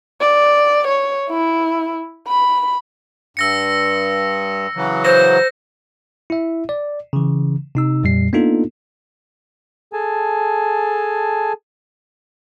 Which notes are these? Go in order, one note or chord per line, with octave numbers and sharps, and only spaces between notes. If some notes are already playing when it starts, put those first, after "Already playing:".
D5
C#5
E4
B5
G2 E6 A#6 C#7
C#3 E3 F#3
C5 A#6
E4 E5
D5
C#3 E3
C3 D#4 E6
F2 A#2 G3 C7
A#3 B3 D4 D#4 F4 A4
G#4 A4 G#5 A5